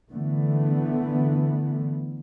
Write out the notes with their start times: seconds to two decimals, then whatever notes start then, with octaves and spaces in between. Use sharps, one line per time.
0.12 D3 E3 A3 B3